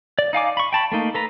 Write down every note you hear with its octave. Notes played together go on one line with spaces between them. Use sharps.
D5
D#4 F5 G#5 D6
B5 C#6
G5 A5 B5
A3 A#3 D#4
A4 B4 A#5